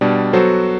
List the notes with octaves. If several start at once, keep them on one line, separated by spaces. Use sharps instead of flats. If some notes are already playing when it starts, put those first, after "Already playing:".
B2 G3 D4
F#3 B3 F#4 A4 C5